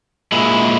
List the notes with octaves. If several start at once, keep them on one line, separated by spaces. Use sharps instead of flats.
A#2 G#3 E4